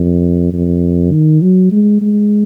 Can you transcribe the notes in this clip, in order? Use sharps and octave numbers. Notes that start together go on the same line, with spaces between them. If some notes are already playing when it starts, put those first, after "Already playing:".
Already playing: F2
F2
D#3
F#3
G#3
G#3